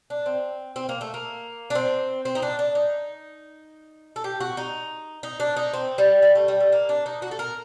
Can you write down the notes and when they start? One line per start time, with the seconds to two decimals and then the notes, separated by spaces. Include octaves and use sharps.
0.10 D4
0.26 C4
0.76 C4
0.89 A#3
1.01 A3
1.14 A#3
1.70 D4
1.75 C4
2.25 C4
2.35 D#4
2.42 D4
2.59 D4
2.75 D#4
4.16 A4
4.24 G4
4.40 F#4
4.57 D#4
5.23 D#4
5.40 D4
5.57 D#4
5.73 C4
5.98 G3
6.22 G3
6.35 A3
6.48 G3
6.60 A3
6.73 A#3
6.89 D4
7.06 D#4
7.22 F#4
7.31 A4
7.39 A#4